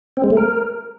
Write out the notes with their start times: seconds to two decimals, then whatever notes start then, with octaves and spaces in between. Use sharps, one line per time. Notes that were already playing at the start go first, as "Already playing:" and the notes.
0.17 C4
0.24 G#3
0.30 A3
0.37 A#4